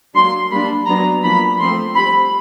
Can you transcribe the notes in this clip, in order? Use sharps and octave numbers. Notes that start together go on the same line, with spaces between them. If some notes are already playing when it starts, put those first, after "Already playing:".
F#3 A#3 D4 C6
G3 A#3 D4 B5
F#3 B3 D4 A#5
F3 A#3 D4 B5
F3 A3 C4 C6
G3 C4 B5